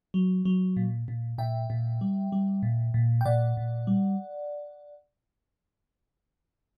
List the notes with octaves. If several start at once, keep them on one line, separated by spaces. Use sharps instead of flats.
F#3
F#3
A#2
A#2
A#2 E5 G5
A#2
G3
G3
A#2
A#2
G5
A#2 D5 F#5
A#2
G3